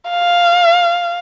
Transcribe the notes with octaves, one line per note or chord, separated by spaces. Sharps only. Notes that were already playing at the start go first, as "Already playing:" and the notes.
F5